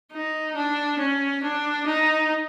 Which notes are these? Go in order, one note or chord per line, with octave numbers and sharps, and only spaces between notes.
D#4
D4
C#4
D4
D#4